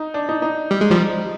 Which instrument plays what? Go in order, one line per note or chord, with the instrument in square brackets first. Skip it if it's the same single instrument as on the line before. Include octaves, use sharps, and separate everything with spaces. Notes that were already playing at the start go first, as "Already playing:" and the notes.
Already playing: [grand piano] D#4
D4
D#4
D#4
[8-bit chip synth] G3
G#3
F3 G3